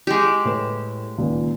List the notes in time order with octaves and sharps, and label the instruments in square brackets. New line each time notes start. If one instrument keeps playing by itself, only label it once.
[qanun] G#3 G4
[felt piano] A2 B4 E7
C#2 A#2 D#3